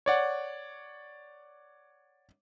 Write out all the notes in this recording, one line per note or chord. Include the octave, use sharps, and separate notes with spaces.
C#5 D5 F#5